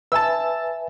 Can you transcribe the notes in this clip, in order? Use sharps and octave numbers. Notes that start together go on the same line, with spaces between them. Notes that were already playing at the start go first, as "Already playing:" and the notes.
B4 E5 G#5 A5 E6